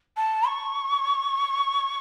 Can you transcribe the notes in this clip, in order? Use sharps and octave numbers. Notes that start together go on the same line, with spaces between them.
A5
C#6